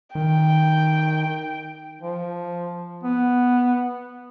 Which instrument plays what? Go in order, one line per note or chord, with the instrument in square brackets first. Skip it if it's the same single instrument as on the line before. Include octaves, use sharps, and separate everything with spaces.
[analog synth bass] D#3 [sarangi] G5
[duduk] F3
B3